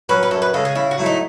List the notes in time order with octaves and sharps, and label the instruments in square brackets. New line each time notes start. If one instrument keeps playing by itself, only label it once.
[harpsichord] F#3 C#4 [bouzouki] B4
[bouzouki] B4
[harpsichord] F#2 [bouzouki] A4
[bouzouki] B4
[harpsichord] C#3 G#3 [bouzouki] A4
[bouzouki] G#4
[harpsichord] C#3 [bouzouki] E4
[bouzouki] F#4
[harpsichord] F#3 A3 E4
[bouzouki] D#4